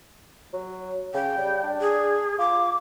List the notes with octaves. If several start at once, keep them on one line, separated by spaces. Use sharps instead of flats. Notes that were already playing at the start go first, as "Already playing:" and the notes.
F#3
C#3 G5
G3
D4
G#4
F4 D6